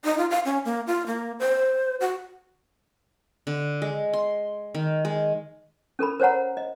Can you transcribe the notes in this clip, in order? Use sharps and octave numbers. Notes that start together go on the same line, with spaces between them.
D#4
F4
F5
C#4
A#3
F4
A#3
C5
F#4
D3
G#3
C6
D#3
G#3
C#4 A4 A#4 B5
A#4 C5 C#5 F#5 A#5
D#5